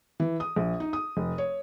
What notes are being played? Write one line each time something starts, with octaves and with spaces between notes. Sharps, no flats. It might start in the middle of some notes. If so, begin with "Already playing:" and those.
E3
D#6
A#1
D#4
D#6
F1
C#5